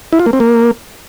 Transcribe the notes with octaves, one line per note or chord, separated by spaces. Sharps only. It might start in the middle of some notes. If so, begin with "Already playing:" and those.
E4
F4
A#3
C4
A#3